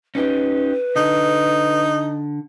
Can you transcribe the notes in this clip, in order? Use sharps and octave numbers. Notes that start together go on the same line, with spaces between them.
C#4 D#4 G4 B4
D3 D#4